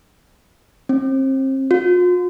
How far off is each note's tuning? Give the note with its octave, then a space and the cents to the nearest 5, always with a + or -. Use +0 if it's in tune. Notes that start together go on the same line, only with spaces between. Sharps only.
C4 +35
F4 +40